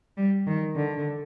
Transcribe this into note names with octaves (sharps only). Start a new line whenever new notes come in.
G3
D#3
D3